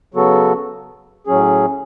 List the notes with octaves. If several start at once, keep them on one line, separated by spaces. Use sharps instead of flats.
C#3 F#3 B3 F#4 A4
A2 F#3 C#4 G#4